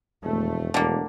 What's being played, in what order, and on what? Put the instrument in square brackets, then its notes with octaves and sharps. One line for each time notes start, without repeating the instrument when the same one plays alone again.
[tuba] E1 [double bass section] F2 A3
[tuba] E1 [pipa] D3 A#3